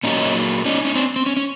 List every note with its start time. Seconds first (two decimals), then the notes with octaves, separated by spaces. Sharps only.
0.03 A#2 F#3 A#3 C#4 D#4
0.65 C#4 D#4
0.85 C#4 D#4
0.95 C4 D4
1.16 C4
1.26 C#4
1.37 C#4